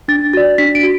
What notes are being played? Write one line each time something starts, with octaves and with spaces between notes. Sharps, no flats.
D4 A6
F#4 D5 A6
D4 B6
D7
F#4